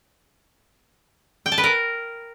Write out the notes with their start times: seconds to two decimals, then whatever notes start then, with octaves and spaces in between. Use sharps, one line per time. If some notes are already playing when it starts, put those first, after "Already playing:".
1.46 G5
1.52 A5
1.58 B4
1.64 A#4